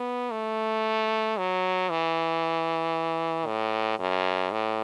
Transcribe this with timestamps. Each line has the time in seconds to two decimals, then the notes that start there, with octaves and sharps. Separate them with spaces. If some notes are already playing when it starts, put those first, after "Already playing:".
Already playing: B3
0.32 A3
1.37 F#3
1.90 E3
3.47 A2
3.99 F#2
4.51 A2